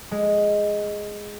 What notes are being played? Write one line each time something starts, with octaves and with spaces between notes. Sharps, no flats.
G#3